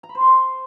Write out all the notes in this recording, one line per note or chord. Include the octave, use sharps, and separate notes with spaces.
A#5
B5
C5
C6
C5